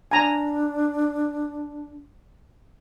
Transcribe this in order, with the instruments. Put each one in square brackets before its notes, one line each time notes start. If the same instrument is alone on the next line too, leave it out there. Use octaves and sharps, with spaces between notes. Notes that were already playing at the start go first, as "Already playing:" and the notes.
[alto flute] D4 [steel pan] G#5 A#5